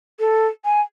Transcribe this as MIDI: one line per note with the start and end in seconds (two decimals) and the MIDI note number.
0.20 0.47 69
0.65 0.81 80